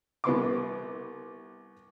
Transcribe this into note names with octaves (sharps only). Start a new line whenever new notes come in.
C2 B3 C6 D6